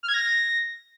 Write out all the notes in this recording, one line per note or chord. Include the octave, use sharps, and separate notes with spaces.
F6
G#6
A#6